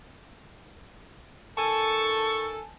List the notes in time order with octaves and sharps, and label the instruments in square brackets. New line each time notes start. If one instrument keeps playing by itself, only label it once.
[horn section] D#3 A4 [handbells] G#5 A5 [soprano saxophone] C#6